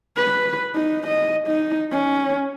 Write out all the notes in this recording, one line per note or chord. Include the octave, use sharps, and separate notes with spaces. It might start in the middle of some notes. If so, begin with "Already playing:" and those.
B4
D#4
D#5
D#4
C#4